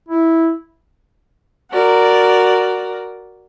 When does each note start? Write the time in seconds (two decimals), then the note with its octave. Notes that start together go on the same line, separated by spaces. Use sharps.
0.08 E4
1.70 F#4 A#4 D5